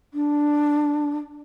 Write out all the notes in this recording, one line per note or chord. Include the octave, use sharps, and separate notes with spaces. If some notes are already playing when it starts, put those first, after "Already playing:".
D4